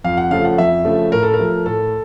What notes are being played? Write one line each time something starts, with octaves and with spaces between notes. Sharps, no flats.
F2 F5
F#5
C#3 F3 A3 F5
F#5
F2 E5
C#3 F3 A3
A2 A#4
A4
A#4
F3 A3
A2 A4